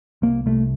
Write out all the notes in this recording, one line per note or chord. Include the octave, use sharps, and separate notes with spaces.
C2 A#3
C2 A3